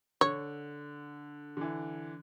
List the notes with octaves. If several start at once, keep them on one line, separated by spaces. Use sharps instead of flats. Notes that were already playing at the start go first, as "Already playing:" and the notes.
D3 C#5
D3 E3